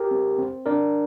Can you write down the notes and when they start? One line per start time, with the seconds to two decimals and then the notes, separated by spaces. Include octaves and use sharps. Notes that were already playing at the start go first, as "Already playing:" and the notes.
Already playing: G4 A#4
0.11 C4
0.39 C4
0.66 D4 A#4 D5